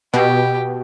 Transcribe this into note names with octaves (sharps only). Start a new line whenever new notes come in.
B2 G4